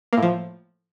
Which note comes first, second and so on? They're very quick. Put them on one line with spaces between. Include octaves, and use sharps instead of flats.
A#3 A2 F3